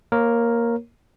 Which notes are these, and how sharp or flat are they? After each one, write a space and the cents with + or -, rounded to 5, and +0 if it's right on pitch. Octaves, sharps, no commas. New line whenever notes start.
A#3 +5 A#4 +0 C#5 -20